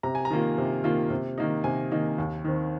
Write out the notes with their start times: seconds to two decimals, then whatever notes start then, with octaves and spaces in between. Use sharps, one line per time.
0.03 C3 A#5
0.15 G#5
0.25 A#5
0.30 D#3 A#3 F4
0.58 C3
0.84 D#3 A#3 F4
1.10 C3
1.38 D#3 A#3 D#4
1.64 C3 G#5
1.92 D#3 A#3 D#4
2.18 D#2
2.44 D#3 C4